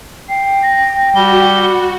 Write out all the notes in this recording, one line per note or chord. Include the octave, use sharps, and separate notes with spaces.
G5 C7
A#6
G3 F#4 G7